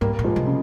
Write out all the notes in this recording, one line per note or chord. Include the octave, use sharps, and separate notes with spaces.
G#2 G3 A#3
A#2
F3 G#3
C3
C#3